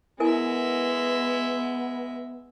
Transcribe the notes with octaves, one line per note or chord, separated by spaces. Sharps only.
G#3 B3 E4 A#4 E5 G#5